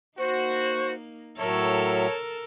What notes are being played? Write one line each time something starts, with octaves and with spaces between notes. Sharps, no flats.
A#3 D#4 F#4 C5
A2 F#3 A4 A#4 C#5 E5 A5